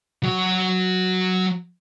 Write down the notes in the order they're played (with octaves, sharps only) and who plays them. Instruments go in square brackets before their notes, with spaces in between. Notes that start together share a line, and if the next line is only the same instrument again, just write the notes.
[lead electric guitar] F#3 F#4